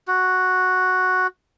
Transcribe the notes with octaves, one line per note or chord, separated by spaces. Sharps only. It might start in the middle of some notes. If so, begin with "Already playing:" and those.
F#4